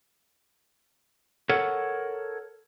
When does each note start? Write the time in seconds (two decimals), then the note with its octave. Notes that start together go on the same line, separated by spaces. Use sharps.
1.49 A4 A#4 C#5 F#5